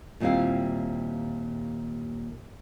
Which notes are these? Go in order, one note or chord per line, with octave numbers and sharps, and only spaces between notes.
D#2 A#2 G3 C4 E4 F5